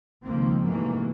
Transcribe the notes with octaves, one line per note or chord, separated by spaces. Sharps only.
C#2 D#3 F3 A#3 C4
G#2 C3 E3 F#3 A3 A#3